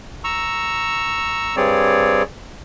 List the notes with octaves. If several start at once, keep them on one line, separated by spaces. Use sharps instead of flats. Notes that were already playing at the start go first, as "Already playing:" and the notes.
A#5 C#6 E6
G2 G3 C4 G#4 C#5 D5